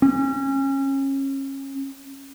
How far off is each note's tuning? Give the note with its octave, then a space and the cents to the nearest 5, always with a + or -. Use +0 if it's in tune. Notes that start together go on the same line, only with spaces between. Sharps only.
C#4 -25